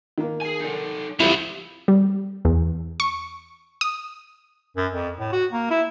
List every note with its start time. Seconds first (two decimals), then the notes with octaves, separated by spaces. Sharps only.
0.18 D#3 A#3
0.41 G#4 G#5
0.61 D#4 A4
1.20 C2 E3 F3 G3 E4 G4
1.88 G3
2.45 E2
3.00 C#6
3.81 D#6
4.77 F#2
4.93 F2
5.19 A2
5.33 F#4
5.53 A#3
5.71 E4